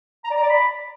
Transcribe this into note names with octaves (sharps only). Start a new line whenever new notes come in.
A#5
D5
A#5
D5
B5